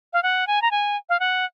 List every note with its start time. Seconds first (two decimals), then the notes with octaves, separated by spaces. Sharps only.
0.13 F5
0.23 F#5
0.47 G#5
0.62 A#5
0.71 G#5
1.09 F5
1.20 F#5